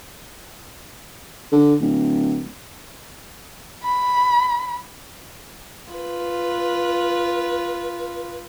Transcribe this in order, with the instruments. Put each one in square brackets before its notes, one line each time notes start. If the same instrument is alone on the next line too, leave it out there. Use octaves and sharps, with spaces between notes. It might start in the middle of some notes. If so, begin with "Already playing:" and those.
[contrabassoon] D3
D1
[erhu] B5
[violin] F4 B4